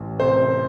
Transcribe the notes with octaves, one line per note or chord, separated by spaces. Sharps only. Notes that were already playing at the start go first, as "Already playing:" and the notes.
Already playing: A1
C3 C5